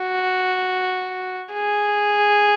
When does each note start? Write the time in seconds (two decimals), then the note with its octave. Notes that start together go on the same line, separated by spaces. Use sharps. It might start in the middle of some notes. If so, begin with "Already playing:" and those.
Already playing: F#4
1.53 G#4